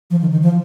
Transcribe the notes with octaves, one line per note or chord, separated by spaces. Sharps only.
F3
D#3
D#3
F3